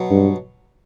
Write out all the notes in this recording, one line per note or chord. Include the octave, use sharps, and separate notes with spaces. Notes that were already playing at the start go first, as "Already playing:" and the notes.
Already playing: B2 F#3
G2